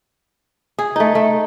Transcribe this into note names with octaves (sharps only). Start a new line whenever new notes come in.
G#4
A3 D#4
A3